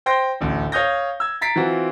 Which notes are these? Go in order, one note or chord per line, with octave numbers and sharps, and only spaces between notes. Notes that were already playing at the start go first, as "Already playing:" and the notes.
C5 G5 C6 G6 A#6
A1 D2
C#5 F5 D#6 G6 A#6
E6 G#6
A#5 A6 B6 C7 D7
E3 C4 F4 F#4